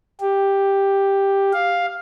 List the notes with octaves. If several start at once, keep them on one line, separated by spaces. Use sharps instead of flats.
G4
F5